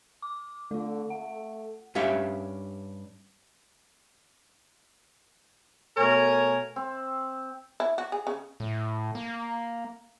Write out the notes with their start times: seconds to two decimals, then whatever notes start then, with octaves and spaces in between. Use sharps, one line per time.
0.22 D6
0.71 D3 A3 F4
1.10 A3 F#5
1.95 G2 C#4 G4 E5 F5
5.97 B2 A3 A#4 C#5 G#5
6.76 C4
7.80 E4
7.98 F#4
8.12 G#4
8.27 C#3
8.60 A2
9.15 A#3